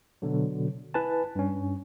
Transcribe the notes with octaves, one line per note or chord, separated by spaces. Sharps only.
B2 D3 F#3
E4 B4 G#5 A5
G2 C#4